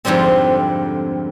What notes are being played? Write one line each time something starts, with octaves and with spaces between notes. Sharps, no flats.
F2 G#2 D3 G3 C4